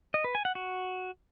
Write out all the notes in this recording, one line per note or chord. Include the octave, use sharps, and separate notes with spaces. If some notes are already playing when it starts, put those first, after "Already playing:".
D#5
B4
G#5
F#5
F#4